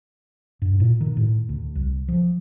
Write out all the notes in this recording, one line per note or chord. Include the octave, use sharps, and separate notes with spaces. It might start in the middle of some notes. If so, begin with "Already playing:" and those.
G2
A#2
D#3
A2
D2
C2
F3